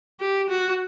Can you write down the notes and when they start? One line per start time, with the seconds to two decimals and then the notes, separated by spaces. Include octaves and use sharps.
0.20 G4
0.49 F#4